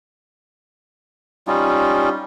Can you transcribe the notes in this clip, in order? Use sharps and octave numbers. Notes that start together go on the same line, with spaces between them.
G3 C#4 D#4 F4